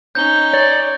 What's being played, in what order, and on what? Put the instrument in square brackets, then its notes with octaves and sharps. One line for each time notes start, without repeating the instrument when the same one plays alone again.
[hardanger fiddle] C#4 D#4 [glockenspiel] G6 G7
[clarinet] C#5 [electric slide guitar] D5